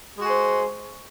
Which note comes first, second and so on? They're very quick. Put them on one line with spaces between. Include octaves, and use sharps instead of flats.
G#3 F#4 G#4 C5